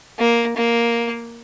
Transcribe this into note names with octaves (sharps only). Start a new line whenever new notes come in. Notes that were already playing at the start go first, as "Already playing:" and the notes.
A#3
A#3